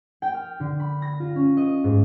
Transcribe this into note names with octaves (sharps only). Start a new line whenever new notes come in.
G5
F6
D3
B5
A#6
F4
C#4
D#5
G#2